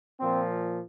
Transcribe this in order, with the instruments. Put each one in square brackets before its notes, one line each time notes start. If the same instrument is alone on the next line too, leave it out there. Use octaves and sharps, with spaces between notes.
[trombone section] A#2 F3 C4